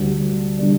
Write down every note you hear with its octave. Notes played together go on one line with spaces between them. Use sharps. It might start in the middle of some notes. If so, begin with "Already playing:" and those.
Already playing: D2 D3 G3 D4
D3 G3 D4